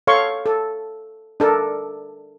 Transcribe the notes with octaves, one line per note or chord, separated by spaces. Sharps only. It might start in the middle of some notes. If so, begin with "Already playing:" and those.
A4 C#5 F5 C6 C#6
A4
D4 A4 A#4